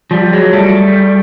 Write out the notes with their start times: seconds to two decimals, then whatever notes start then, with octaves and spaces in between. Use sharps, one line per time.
0.11 F3 G3
0.33 F#3 G#3
0.53 G3 A3